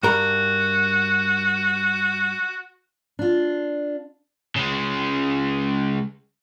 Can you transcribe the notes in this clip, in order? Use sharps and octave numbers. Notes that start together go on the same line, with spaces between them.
G2 F#4 A#4 B5
D4 F4
C#3 G#3